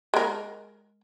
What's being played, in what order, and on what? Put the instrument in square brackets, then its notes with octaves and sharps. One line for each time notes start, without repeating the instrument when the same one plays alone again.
[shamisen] G#3 A#4